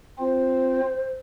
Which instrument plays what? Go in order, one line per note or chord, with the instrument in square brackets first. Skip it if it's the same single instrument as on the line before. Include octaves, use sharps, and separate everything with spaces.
[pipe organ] C4 F4 [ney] C5